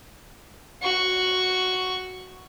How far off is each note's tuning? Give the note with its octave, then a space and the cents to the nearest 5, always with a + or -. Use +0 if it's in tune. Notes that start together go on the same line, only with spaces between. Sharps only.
F#4 +0 C#6 +0